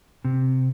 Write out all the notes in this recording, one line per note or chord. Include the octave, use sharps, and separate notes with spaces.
C3